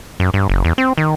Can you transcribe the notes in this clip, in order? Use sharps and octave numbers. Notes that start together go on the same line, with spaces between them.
F#2
G2
F#1
E2
C4
D#3